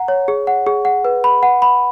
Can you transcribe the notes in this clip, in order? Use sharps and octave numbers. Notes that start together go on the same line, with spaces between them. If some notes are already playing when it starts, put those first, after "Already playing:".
Already playing: F#5 A#5
C#5
G#4
F#5
G#4
F#5
B4
B5
F#5
B5